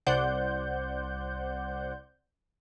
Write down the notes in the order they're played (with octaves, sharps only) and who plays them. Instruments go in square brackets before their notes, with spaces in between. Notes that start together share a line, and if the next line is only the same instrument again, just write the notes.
[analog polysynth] C2 C5 D5 F#5 G6